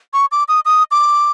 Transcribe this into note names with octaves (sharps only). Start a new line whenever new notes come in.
C#6
D6
D#6
D#6
D6